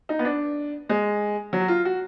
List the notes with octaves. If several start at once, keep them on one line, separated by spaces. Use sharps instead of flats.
D#4
B3
D4
G#3
F#3
F#4
F4
F#4